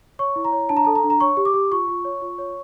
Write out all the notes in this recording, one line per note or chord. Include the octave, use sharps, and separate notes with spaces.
C#5 C#6
E4
A#5
C#5
D4 A5
A#5
A4 A5
A#5
D4
A#5
C#5 C#6
G4
D6
G4
F4 C#6
F4
C#5
F4
C#5